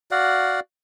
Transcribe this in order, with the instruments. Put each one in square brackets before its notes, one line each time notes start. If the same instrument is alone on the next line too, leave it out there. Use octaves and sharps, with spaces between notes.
[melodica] F#4 D5 F5 F#5